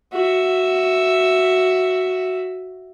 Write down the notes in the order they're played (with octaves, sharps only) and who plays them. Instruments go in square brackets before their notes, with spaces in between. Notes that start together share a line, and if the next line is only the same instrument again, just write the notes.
[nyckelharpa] F#4 E5